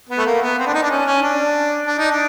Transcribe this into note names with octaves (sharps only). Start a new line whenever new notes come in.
B3
A3
A#3
B3
C4
D4
D#4
D4
C#4
C#4
D4
D4
D#4
D4